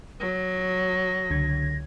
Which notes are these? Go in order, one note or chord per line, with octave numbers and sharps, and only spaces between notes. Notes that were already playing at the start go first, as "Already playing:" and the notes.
F#3 A#6
C#2 D3 G#6